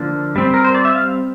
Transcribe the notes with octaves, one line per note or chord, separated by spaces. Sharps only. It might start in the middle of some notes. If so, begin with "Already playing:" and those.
Already playing: D3 F3 A#3 D4
G3 C4
A#4
C5
D5
E5
F5